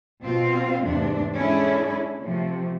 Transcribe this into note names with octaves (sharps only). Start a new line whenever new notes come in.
B2 C4 F4 F5
E2 G#2 C3 A3 D4
G#3 C#4 D4 E4 G#4 A4
C3 F3 A3